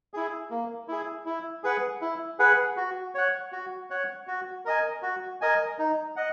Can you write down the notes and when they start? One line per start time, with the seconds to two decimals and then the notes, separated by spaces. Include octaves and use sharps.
0.14 E4 G#4
0.51 A#3
0.88 E4 G#4
1.26 E4
1.64 G#4 B4 F#5
2.01 E4
2.39 G#4 B4 F#5
2.77 F#4
3.15 C#5 F#5
3.52 F#4
3.90 C#5 F#5
4.27 F#4
4.65 A#4 D#5 G#5
5.02 F#4
5.41 A#4 D#5 G#5
5.78 D#4
6.16 D#5 F#5